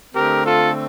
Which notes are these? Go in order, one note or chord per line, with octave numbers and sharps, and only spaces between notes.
D3 A3 C4 G4 A#4
F4 A4